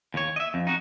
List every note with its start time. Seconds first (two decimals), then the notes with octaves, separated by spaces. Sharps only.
0.14 D#2 C#5
0.36 D#5 E5
0.54 F2
0.67 D#4 F#4